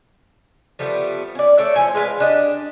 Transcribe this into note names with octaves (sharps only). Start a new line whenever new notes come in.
F3 G3 A3 B3
C#4 D5
A3 C#5 D5 E5
F3 C5 G#5
G#3 B4 F5
D4 G4 D#5